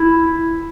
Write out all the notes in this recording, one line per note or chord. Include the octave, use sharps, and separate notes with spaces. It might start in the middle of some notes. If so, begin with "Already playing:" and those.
Already playing: E4